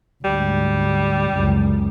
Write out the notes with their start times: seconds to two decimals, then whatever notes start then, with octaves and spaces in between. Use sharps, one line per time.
0.24 D2 G#2 G3
1.29 C#2 F#2